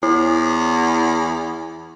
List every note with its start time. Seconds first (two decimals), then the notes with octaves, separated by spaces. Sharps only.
0.03 E2 E4